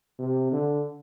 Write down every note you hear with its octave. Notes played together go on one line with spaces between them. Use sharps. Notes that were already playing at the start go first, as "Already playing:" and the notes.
C3
D3